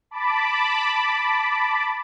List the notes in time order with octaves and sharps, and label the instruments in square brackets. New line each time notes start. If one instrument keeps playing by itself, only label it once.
[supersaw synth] A5 B5 D6